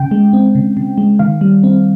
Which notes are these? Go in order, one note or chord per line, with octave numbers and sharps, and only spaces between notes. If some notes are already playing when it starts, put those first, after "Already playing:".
Already playing: C#3 G5
G#3
C4
C#3
C#3
G#3
D#3 F5
G3
C4